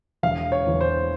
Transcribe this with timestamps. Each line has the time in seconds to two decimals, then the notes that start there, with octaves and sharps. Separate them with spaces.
0.23 E1 F5
0.52 C#5
0.66 E2 E3
0.81 C5